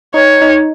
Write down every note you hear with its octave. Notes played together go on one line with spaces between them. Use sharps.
D#4 C#5
D#4